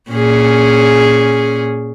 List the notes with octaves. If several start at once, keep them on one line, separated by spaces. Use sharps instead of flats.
A#2 C#4 G#4